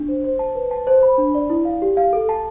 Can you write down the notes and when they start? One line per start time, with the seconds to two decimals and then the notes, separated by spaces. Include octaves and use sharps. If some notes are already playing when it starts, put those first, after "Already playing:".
Already playing: D4
0.08 C5
0.24 C5
0.39 A5
0.55 B4
0.71 A5
0.87 C5
1.03 B5
1.18 D4
1.35 D5
1.50 E4
1.65 F5
1.82 G4
1.97 F5
2.13 A4
2.29 A5